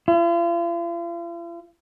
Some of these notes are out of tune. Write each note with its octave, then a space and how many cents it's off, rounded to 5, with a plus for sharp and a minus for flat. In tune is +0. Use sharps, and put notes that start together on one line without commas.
F4 -45